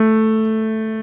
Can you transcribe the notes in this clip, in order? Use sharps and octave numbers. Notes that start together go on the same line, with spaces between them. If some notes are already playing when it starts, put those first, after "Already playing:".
Already playing: A3